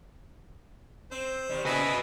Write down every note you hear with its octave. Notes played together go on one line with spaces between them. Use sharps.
C4 C5
B2 D#3 G3
C#3 E4 F#4 G#4 B4 D#5